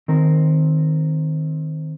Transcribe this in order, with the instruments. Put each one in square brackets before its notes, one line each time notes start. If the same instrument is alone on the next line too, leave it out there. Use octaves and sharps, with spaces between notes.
[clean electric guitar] D#3 C4 A#4